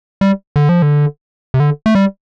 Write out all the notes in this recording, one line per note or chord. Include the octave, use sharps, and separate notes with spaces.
G3
D3
F3
D3
C3
D3
A3
G3